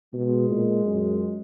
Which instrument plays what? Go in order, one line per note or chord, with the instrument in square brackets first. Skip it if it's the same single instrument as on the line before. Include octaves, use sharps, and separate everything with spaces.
[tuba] B2 [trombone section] G#3
[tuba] A#2
F#2